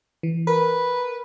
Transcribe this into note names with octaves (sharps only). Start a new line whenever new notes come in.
E3
A#4 B4